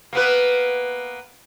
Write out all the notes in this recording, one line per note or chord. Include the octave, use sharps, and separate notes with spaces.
A#3 B3 B4